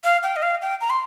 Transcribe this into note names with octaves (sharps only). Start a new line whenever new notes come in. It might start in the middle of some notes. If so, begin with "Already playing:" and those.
F5
G5
D#5
F5
G5
A#5
C6